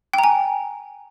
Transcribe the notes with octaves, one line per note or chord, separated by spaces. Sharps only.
G5
A#5
G#5